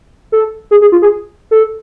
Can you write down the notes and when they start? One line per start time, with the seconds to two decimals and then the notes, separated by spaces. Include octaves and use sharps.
0.32 A4
0.71 G#4
0.81 G#4
0.92 F4
1.02 G#4
1.51 A4